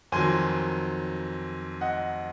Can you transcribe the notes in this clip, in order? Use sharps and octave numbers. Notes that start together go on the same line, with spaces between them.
F2 D#3 F#3 G#5 C6
D#5 F#5